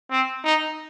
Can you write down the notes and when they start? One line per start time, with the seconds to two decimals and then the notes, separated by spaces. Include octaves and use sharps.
0.11 C4
0.44 D#4